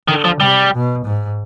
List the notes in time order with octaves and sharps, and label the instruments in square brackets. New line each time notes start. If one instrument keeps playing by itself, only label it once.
[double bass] D3 [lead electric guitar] D#3
[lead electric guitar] F3
[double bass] C3 [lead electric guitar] G3
[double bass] B2
G#2